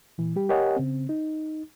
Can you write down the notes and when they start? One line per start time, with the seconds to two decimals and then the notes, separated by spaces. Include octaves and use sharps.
0.18 A#2 E3
0.36 G3 G4
0.49 G4 A#4 C#5 D#5 F#5 G#5
0.76 C#3 C4
1.09 D#4